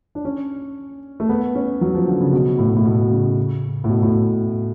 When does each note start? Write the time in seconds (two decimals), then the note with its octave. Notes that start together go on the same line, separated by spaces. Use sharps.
0.15 D4
0.25 C#4
1.20 A3
1.29 B3
1.55 C#4
1.81 F#3
1.94 F3
2.07 D3
2.20 C#3
2.33 B2
2.59 A2
2.68 B2
2.77 A2
2.85 B2
3.11 C#3
3.84 A2
3.89 B2
4.03 A2